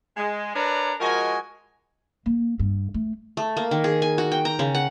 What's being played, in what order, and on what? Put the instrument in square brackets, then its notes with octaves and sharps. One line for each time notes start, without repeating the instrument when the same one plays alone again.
[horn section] G#3
D4 A#4 B4 C#5 D5 A#5
F3 G#3 F#4 A#4 D#5 G#5
[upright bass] A#3
G2
A3
[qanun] A3
A#3
D#3
G#4
G#5
F#4
G5
A#5
C#3
F#5